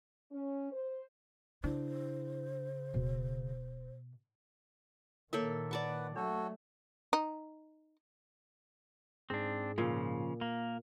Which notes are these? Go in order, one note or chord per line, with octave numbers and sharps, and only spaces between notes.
C#4
C5
C#3 D4 E4 C5
D1 B2
A#2 D#3 A#3 A4 A#4 C#5 E5
B4 D5 F#5 A5 C#6
F#3 A3 D4 F#4 A4 C#5
D#4
G#2 C4 D4 G#4
A#2 C#3 F3
A#3